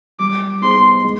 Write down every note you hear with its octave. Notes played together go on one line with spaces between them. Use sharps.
G3 D6
B3 D#4 G#4 C5 C6
G#3